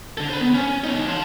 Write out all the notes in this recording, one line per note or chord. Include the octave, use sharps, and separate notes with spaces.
D4 A4
C5 B5
B3
C#4
D#4 C#5
A5 C6